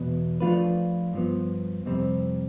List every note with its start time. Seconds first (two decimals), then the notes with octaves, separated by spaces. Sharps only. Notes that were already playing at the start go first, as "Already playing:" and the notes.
Already playing: E2 B2 B3
0.40 F3 A3 D4 F4 B4
1.13 G2 F3 B3
1.86 F2 C3 G3 C4